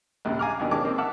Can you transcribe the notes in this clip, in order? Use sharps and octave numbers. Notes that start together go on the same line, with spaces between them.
A#1 D#2 C#3
F5 G#5 A#5 D6 F6
D#2 B2 D#3 D4
D#3 G#3 C#4 A5 D6
A#3 C4
E5 F#5 A5 D6 E6 F6